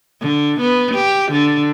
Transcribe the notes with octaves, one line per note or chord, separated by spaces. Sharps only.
D3
B3
G4
D3